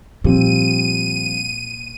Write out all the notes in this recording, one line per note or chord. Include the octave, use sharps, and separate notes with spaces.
A#2 F3 G3 C4 D#7